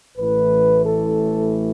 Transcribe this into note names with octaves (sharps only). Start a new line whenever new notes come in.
A1 A2 E3 B4
A4